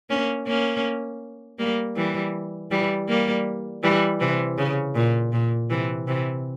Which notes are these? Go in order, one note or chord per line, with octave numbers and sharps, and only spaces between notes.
A#3 C#4
A#3 C#4
G3 A#3
E3 G3
E3 G3
G3 A#3
E3 G3
C3 E3
C#3
A#2
A#2
C3 E3
C3 E3